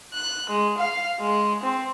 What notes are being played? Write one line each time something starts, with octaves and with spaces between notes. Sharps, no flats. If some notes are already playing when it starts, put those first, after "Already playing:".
F#6
G#3
F5
G#3
C4